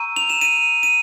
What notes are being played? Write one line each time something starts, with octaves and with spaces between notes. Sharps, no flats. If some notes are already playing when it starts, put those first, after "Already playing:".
Already playing: A#5 C#6 E6 G6 D#7
F7
E7
D#7
D#7